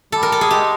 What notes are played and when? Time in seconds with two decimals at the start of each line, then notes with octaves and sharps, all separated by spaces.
0.12 G3 A4
0.23 A#4
0.32 A4
0.41 G#4
0.51 G#3 G4